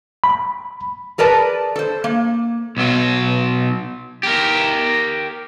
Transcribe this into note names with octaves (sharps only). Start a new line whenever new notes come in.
B5
G#4 A#4 B4 D5 A5
A4 C5
A#3
B1 F#3
G4 A#4